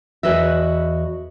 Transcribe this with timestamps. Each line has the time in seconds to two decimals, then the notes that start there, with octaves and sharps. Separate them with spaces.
0.23 E2 F#4 B4 D#5 E5